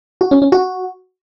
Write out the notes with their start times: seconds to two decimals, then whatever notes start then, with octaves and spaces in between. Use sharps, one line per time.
0.21 F#4
0.31 C#4
0.42 C#4
0.52 F#4